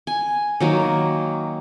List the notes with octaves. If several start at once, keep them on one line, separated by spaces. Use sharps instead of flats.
G#5
D#3 F#3 A#3